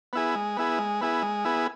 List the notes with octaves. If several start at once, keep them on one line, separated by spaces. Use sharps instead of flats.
B3 E4 G#4
G#3
B3 E4 G#4
G#3
B3 E4 G#4
G#3
B3 E4 G#4